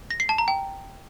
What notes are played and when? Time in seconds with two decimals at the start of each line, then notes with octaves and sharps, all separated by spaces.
0.10 A#6
0.20 C7
0.29 A5
0.38 A#5
0.48 G5